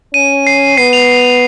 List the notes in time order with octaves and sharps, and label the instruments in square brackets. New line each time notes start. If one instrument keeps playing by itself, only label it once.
[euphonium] C#4 [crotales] D#7
[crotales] C7
[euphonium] B3 [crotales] C7
[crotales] F7